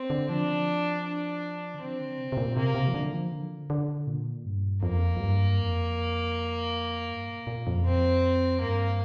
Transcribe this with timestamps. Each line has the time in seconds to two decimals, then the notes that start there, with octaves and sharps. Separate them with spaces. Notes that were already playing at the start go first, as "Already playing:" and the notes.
Already playing: C4
0.10 D3
0.29 F3 D4
1.05 D4
1.74 D3
1.80 F3 C4
2.00 D3
2.18 C3
2.32 C3
2.37 A#2
2.56 C3 A#3
2.75 C3
2.88 F3
2.94 D3
3.14 F3
3.32 D3
3.70 D3
4.07 A#2
4.45 G2
4.83 F2 A#3
5.16 F2
5.20 G2
5.59 F2
7.09 G2
7.29 A#2
7.47 A#2
7.67 F2
7.86 C4
8.61 G2 A#3